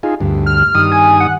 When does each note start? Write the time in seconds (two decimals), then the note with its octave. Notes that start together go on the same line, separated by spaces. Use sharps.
0.03 D#4 F4 G#4
0.21 D2 G2
0.46 F6
0.75 G2 D#3 D#6
0.92 G#5
1.20 F#5